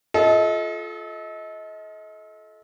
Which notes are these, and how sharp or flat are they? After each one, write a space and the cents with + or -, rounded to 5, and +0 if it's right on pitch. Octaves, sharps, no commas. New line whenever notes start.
F4 +5 A4 -25 D#5 +30